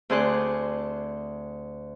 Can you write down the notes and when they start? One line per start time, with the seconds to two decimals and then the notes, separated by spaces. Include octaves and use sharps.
0.10 D2 C4 G#4 D5 C6 F#6